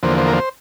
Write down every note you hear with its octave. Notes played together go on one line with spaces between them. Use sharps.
E2 D3 F3 A#3 C5
C5
A#4
C5